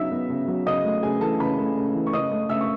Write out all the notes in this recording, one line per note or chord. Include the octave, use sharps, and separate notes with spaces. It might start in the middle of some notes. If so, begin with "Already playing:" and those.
Already playing: C#3 F#3 B3 D#4 E5 E6
B3
C#3
F#3
C#3 D#5 D#6
A3
C#3 G#4 G#5
E3 A4 A5
C#3 B4 B5
A3
C#3
E3
C#6
C#3 D#5 D#6
A3
C#3 E5 E6
C#6